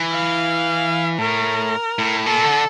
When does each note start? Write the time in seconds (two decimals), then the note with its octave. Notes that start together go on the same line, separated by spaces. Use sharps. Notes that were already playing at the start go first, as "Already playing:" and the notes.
Already playing: E3
0.11 F5
1.18 A2 A#4
1.99 A2
2.25 A#2 A4
2.44 D3